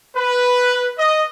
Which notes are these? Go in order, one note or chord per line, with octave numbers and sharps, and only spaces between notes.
B4
D#5